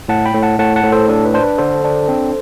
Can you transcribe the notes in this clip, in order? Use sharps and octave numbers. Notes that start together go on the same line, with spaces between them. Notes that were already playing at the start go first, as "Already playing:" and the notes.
A2 F#5 A5
G5 B5
A2
F#5 A5
A2 F#5 A5
F#5 A5
A2
A4 C5
D4 A4
B4
D4 C5
B4
D3 A4 C5
D4
C4